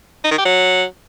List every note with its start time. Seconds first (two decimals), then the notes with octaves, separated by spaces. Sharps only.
0.24 D#4
0.31 D#3
0.38 G4
0.45 F#3